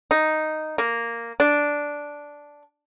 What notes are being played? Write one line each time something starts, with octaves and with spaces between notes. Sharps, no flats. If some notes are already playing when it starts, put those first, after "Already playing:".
D#4
A#3
D4